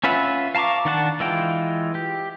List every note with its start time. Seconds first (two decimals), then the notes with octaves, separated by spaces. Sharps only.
0.04 C#4 F4 B4 E5 F#5
0.55 F5 A5 A#5 C#6 D6
0.85 D#3 D4 F#5 A5
1.20 E3 G#3 F4 G5
1.95 G4